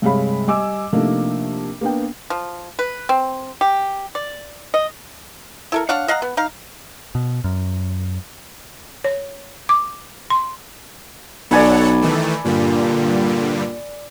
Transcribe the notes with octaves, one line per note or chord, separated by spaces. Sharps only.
G2 C3 G#3 C#5 F5 B5
G3 D#5 G#5 D6 E6
C3 F3 A3 A#3 D4 D#4
A#3 B3 D4 G5
F3
B4
C4
G4
D5
D#5
E4 A4 A#4
D4 C#5 F5 F#5
D#5 F5 F#5 A#5
B3
D#4 F5
B2
F#2
C#5
D6
C6
B1 A4 C#5 D5 F#5 G#5 B5
D#3 E3 A3
G2 A#2 D3 G3